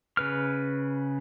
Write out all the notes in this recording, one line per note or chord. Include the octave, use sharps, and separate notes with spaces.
C#3 B4 F6